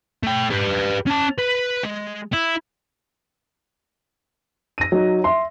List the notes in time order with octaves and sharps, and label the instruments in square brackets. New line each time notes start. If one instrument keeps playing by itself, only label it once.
[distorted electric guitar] A3 G5
G4 B4
C#4 A5
B4
G#3
E4
[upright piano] A#6 D#7
F#3 D#4
E5 C6